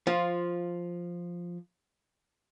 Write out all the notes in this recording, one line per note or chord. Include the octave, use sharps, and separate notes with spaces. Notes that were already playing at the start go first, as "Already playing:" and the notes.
F3 F4